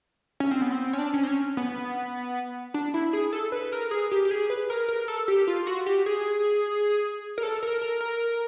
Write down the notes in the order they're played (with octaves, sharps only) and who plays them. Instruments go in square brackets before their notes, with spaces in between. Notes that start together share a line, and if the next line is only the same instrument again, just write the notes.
[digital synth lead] C#4
C4
B3
C4
C#4
D4
C#4
C4
C#4
B3
D4
E4
G#4
A4
B4
A#4
G#4
G4
G4
G#4
B4
A#4
A#4
A4
G4
F4
F#4
G4
G#4
A#4
A4
A#4
A#4
A#4